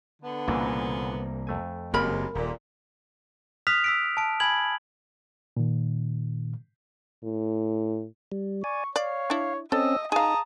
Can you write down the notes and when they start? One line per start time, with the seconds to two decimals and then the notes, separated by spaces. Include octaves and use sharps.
0.22 D3 B3
0.48 C2 A#2 C#3 E3 A#3
1.47 F2 A3 G#5
1.94 F#1 F#2 C3 G#3 A#3 A#4 B5
2.35 D#1 A#2
3.67 D#6 F6 F#6 B6 F7
3.84 E6 B6 D7
4.17 A5 D7
4.40 G#5 B5 G#6 F#7
5.57 A#2 D#3
7.24 A2
8.32 G3
8.64 D5 G#5 C#6
8.96 C#5 D5 F5
9.30 D4 E4
9.72 C4 C#4 A4 D#5 E6
10.12 D#4 G#4 F5 A5 A#5 D#6